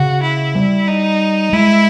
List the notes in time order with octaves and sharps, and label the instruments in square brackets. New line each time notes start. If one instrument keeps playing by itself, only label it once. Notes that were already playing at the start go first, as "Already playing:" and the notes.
Already playing: [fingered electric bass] C#3 [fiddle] F#4
[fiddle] E4
[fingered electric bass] G3
[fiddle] D#4
[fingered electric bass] G#3 [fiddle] E4